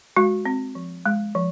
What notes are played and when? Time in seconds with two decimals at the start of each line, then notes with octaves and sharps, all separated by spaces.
0.17 G#3 F#4
0.46 C4
0.75 F3
1.06 G#3
1.35 F3